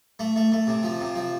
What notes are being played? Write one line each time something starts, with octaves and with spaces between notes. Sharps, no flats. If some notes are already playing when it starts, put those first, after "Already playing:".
A3
A3
A3
C3
F3
C3
F3